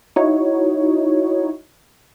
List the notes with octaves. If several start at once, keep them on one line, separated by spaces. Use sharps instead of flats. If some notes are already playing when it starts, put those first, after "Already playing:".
D#4 E4 F#4 C#5